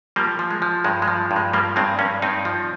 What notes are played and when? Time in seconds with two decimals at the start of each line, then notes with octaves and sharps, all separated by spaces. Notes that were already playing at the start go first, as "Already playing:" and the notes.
0.16 F3 G3 A#3
0.39 F3
0.51 G#3
0.62 F3
0.84 G2 G#3
1.02 G#3
1.08 F3
1.31 G2
1.36 G#3
1.53 F3 G3 A#3
1.76 G2 G#3 C4
1.99 G2 A#3 C#4
2.22 G2 C4 D#4
2.45 F3